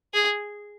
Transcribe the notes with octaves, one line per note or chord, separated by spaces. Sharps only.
G#4